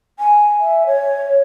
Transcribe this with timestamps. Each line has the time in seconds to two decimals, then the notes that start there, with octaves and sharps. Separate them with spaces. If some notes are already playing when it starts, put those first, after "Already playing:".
0.19 G#5
0.60 E5
0.87 C#5